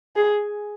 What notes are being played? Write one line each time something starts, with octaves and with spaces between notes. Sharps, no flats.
G#4